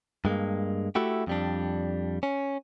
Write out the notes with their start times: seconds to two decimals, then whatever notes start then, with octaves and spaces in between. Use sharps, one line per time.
0.25 G2 G#3 A#3
0.95 A3 E4 F#4 G4
1.27 F2 G3 D4
2.23 C#4